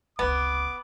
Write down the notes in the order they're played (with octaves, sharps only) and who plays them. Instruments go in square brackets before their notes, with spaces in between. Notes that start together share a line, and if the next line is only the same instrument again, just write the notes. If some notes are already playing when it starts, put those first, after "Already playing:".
[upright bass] F1 C#2 [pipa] B3 [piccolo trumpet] D6